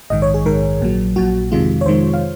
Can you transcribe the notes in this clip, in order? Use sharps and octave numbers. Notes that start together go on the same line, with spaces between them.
A#1 G#2 D#3 D#5
C#5
G#4
A#1 G#2 D#3 A#4
A#1 A#2 F#3
A#1 A#2 F#3 F#4
F2 C3 D#3 G#3 F4
C#5
F2 C3 D#3 G#3 C5
F5